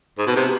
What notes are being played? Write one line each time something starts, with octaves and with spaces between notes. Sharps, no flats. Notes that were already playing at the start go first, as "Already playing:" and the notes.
G#2
B2
C3